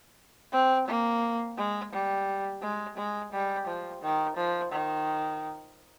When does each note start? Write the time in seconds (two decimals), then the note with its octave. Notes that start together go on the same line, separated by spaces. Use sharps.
0.52 C4
0.87 A#3
1.57 G#3
1.92 G3
2.62 G#3
2.97 G#3
3.32 G3
3.67 F3
4.02 D#3
4.36 F3
4.72 D#3